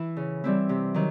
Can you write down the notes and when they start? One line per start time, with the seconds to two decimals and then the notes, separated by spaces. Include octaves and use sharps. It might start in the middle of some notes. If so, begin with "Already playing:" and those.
Already playing: E3 E4
0.17 C#3
0.44 E3 G3 C4 E4
0.69 C3
0.94 D#3 F#3